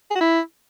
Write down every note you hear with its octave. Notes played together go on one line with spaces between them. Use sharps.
G#4
F#4
E4